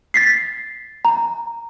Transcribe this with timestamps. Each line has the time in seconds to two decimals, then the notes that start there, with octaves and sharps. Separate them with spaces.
0.14 A6 B6 C7
1.05 A#5